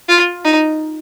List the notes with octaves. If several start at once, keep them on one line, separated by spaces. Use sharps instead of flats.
F4
D#4